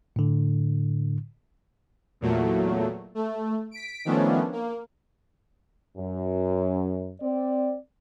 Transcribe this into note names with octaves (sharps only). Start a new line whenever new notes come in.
A2 D3
E2 A#2 F#3 A3
A3
B6 D7
D#3 F3 A3 B3 C#4 D4
A#3
F#2
C4 D5